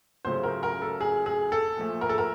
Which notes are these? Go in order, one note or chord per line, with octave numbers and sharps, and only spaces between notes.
C#2 C#3 F#3 A3 C5
A#4
A#4
A4
G#4
G#4
A4
A#2 F3 A3
A#4
A4
A#4